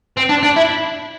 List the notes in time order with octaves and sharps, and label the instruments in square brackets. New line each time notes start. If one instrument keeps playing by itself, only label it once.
[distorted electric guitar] C4
D4
D4
E4